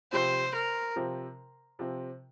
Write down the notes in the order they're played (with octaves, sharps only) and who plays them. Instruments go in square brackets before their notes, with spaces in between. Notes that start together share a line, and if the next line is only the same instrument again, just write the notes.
[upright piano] C3 F3 C4 [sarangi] C5
[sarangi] A#4
[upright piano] C3 F3 C4
C3 F3 C4